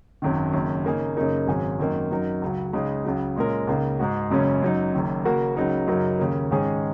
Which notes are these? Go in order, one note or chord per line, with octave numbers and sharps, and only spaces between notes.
G#1 F#2 D#3
F#1 F#2 D#3
C#3 A#3 D#4 G#4
F#2 C#3 A#3 D#4 A#4
G#1 G#2 F#3 C#4 G#4
F#2 D#3 F#3 A#3 D#4
F#2 F#3 D#4 A#4
C#2 C#3 F#3
C#2 C#3 G#3 D#4
C#2 C#3 F#3
A#2 G#3 C#4 A#4
C#2 C#3 A#3 D#4 A#4
G#2 G#3 F#4
F#1 F#2 C#3 G#3 C#4
F#2 F#3 D#4
F#1 F#2 D#3
C#3 A#3 F#4 A#4
C#2 C#3 F#3 D#4 A#4
F#2 C#3 F#3 D#4 A#4
D#2 C#3 A#3
G#2 D#3 G#3 C#4 G#4